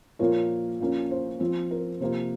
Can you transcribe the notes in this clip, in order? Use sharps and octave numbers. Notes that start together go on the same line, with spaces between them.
A#2 F3 A#3 A#4 C#5
A#2 F3 A#3 C#4
C5
F3 C4
A#4
C3 F3 A#3 C5